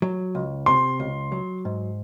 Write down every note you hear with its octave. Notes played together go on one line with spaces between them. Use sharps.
F#3
C#2
C3 C6
C#2
F#3
G#2